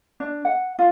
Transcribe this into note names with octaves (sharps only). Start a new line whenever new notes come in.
D4
F#5
F4